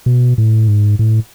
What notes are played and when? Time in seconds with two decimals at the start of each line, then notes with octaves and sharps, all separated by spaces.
0.06 B2
0.38 A2
0.68 G#2
0.99 A2